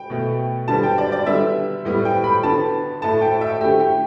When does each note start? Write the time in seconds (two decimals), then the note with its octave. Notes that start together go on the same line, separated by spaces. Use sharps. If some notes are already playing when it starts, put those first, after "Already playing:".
Already playing: G5
0.10 B2 A3
0.68 D3 G3 B3 A5
0.83 G5
0.98 D5
1.12 D5
1.26 D3 G3 B3 E5
1.85 A2 G3 B3
2.05 G5
2.24 B5
2.43 D3 B3 A5
3.02 A2 A3 A5
3.21 G5
3.41 E5
3.61 D3 A3 G4
3.80 G4